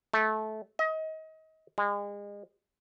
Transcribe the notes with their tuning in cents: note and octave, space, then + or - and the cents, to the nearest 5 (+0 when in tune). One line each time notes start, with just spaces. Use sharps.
A3 -20
D#5 +30
G#3 -35